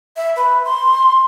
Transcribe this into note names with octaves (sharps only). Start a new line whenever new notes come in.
E5
B4
C6